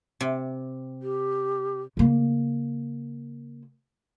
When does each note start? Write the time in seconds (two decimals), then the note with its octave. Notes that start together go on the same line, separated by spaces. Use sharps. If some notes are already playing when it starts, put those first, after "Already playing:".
0.21 C3
1.03 G4
1.97 C#3 A#3